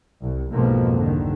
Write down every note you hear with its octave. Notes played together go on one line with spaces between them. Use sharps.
C2
B1 F2 G#2 B2 F3 A#3
C2 D3 D#3